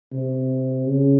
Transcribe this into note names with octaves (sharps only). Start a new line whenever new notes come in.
C3
C#3